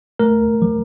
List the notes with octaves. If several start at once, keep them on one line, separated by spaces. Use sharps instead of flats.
A3 A#4
F3